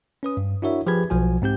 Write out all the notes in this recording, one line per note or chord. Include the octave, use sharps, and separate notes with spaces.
C#4 B4 D#6
G2
D4 E4 F#4 A#4 C#5 E5
F3 G4 G#4 B4 B5 G#6
B1 F3 F#4 G#5
G#2 C4 G4 G6